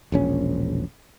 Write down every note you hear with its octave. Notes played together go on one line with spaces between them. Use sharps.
E1 A#1 C#4